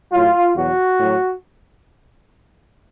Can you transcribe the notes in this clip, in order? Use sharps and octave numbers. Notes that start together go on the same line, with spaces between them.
A2 F#3 F4
E2 B2 F#3 F#4
A2 F#3